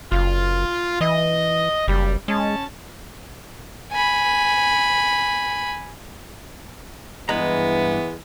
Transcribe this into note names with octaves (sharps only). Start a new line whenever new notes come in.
F#1 F4
E3 D#5
F#1 G3
G#3 C#4 A5
G#5 B5
G2 E3 G#3 B3 B4 A#5